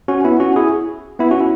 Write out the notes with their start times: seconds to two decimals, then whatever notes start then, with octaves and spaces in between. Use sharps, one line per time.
0.08 C#4 F#4
0.24 B3 E4
0.40 C#4 F#4
0.56 E4 G#4
1.19 B3 E4
1.31 C#4 F#4
1.41 E4